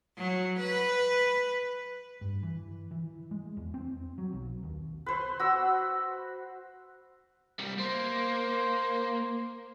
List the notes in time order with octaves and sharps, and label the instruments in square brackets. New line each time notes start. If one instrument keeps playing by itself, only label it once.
[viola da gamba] F#3
B4
[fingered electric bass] G2
E3
E3
G#3
E2
C4
F#3
B1
D#2
[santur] B4 C5
F#4 E6
[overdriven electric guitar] C2 G3
[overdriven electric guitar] A#3 [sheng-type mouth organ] C5